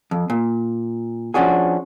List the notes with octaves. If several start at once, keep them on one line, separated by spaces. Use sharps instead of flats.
F2
A#2
F3 C#4 D4 F#4 G#4